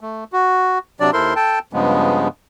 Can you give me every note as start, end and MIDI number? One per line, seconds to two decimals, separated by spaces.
0.01 0.24 57
0.33 0.78 66
1.00 1.11 48
1.00 1.11 54
1.00 1.11 62
1.00 1.11 74
1.13 1.34 39
1.13 1.34 64
1.13 1.34 69
1.13 1.34 70
1.13 1.34 72
1.13 1.34 84
1.36 1.59 69
1.36 1.59 79
1.36 1.59 81
1.73 2.28 43
1.73 2.28 49
1.73 2.28 53
1.73 2.28 56
1.73 2.28 59